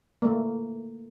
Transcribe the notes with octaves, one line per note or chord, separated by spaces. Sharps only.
A3 A#3